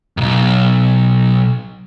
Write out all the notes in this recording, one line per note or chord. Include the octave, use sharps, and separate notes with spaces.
B1 F#2